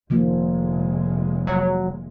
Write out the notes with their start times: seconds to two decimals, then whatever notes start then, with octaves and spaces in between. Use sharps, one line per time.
0.10 F1 D#3 F3 G#3 A#3
1.47 F#3